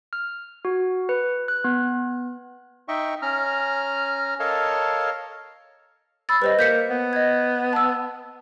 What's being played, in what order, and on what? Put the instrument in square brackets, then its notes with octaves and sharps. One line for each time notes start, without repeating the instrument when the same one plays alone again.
[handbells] F6
F#4
B4
F#6
B3
[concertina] D#4 D#5 E5 G5 C#6
C#4 A#5 F6
A4 A#4 C#5 D#5 F5 A5
[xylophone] B5 E6 A6
[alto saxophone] G3 [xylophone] B4 C5 D#5
[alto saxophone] A#3 [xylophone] G6 B6 C#7
[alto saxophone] B3
[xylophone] D#5 G#6
A5 E6